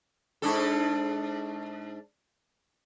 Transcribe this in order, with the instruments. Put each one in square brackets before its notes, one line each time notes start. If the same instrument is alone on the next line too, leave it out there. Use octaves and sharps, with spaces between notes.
[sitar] G#2 D4 A4